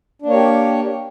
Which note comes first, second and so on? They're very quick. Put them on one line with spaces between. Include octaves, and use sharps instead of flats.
D4 A#3 C#5 G4